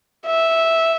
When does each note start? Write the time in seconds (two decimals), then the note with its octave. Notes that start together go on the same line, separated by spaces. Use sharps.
0.27 E5